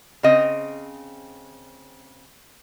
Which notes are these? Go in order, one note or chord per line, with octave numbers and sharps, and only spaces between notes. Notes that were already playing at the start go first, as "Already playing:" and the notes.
C#3 C4 D#5